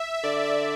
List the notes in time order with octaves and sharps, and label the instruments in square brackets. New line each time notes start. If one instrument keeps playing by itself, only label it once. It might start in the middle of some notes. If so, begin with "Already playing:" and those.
Already playing: [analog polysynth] E5
E5
[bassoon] D3 [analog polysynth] D5
[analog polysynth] E5